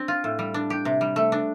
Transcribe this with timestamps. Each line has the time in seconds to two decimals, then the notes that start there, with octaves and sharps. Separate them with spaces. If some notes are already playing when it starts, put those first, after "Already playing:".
Already playing: C4 D4
0.08 F4
0.24 A2
0.39 G3
0.54 D4
0.70 G4
0.85 C3
1.01 G3
1.16 A3
1.32 D4